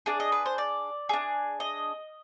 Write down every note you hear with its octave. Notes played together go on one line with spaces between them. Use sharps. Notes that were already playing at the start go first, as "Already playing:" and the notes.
D4 G#4 D5
D#5
B4
C5
D5
D4 G#4
D#5